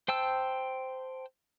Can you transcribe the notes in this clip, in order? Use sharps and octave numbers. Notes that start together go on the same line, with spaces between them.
C5 G5 A5 E6